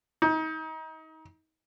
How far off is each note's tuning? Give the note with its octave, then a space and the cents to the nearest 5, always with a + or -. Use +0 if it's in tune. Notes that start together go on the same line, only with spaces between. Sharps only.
D#4 +30